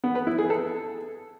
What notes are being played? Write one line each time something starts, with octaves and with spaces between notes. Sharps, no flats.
B3
B4
E4
G#4
A4